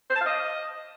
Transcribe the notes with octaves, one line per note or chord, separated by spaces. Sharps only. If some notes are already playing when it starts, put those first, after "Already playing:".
C5
A5
F5
D#5